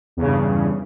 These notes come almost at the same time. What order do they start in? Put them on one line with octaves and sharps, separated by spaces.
E2 C#3 G2